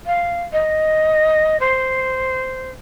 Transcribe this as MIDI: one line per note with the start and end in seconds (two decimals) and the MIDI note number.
0.06 0.42 77
0.53 1.59 75
1.60 2.70 72